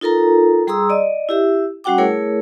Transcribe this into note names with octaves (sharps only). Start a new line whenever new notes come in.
D#4 F4 A4 A#4 A#5
G3 G#4 A#5 C6 D#6 E6
D5 D#5
E4 G4 E5
G3 C#4 F#4 F#5 G5 D6
A3 E4 G#4 A#4 C#5